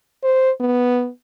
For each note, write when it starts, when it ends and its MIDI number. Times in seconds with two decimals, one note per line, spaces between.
0.24 0.51 72
0.60 1.09 59